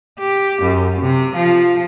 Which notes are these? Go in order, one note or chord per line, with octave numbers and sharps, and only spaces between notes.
G4
F#2
C3
F3